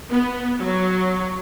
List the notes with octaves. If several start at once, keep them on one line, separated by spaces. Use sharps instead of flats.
B3
F#3